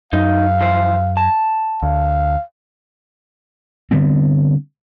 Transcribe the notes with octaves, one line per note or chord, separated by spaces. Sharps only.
F#2 D#4 F5
E3 F3 C5
A5
D2 F5
D3 G3 B3 C4